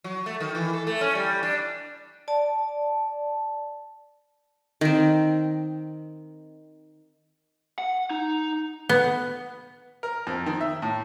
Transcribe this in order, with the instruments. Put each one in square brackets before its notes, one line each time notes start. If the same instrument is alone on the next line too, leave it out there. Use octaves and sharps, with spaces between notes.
[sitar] F#3
A3
D#3
E3
A4
A3
C#4
G3
D4
[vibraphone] D5 A5
[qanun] D#3 C4
[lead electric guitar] F#5
D#4
[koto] B3
[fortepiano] A#4
F2
D#3
E5
A2